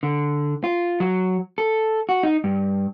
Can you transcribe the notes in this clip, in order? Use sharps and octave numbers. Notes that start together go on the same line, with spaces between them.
D3
F4
F#3
A4
F#4
D#4
G2